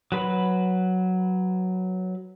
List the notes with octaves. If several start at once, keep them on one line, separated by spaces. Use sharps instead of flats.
F#3 B4 B5